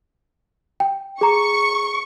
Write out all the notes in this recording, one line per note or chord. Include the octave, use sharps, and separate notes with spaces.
G5
G#4 A#5 C#6